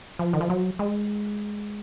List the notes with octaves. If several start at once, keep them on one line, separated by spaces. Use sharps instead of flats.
F3
D#3
F3
F#3
G#3